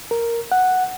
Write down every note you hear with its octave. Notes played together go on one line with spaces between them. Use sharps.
A#4
F#5